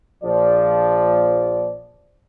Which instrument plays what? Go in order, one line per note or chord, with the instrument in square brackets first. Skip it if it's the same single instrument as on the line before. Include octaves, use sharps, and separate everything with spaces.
[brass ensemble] A#1 F3 D5